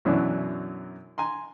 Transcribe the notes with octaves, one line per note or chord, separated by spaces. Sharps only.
F#2 B2 E3 F#3 C#4 D4
G#5 A#5 C6